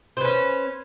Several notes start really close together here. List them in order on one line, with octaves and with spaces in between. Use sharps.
C5 B4 C#4